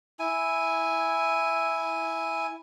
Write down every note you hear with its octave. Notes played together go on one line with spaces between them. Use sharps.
E4 G#5